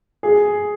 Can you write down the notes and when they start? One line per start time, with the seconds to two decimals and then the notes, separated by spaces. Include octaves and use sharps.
0.23 G#4